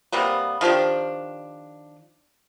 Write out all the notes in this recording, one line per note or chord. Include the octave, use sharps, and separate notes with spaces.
C3 G3 A#3 B3
D#3 F3 D4 G4